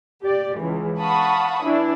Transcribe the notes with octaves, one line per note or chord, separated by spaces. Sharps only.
G4 D5
C#2 E3
F5 F#5 A5 B5 C#6 D#6
E3 D4 E4